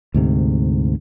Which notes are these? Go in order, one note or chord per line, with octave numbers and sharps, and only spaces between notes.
D2 G#2 C3